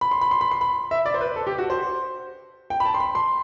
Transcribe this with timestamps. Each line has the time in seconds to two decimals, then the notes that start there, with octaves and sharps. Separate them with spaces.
0.01 B5
0.11 C6
0.21 B5
0.31 C6
0.41 B5
0.51 C6
0.61 B5
0.91 E5
1.06 D5
1.14 C5
1.21 B4
1.36 A4
1.47 G4
1.58 F#4
1.70 C5
2.70 G5
2.80 B5
2.85 A5
2.94 C6
3.00 B5
3.15 C6